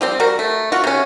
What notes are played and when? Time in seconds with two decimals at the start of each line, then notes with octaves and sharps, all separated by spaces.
0.01 F3 G3 C4
0.20 G3 F#4 A#4
0.39 A3
0.72 F4 F#4
0.84 C3 C#4